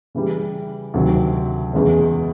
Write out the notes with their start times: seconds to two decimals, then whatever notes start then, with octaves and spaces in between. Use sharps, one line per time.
0.15 C#3 E3 G3
0.94 D2 C3 D#3 F#3
1.73 E2 C#3 E3 G#3 C#4